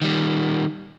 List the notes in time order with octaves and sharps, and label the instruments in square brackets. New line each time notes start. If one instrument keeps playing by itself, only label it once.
[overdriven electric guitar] D#3 G3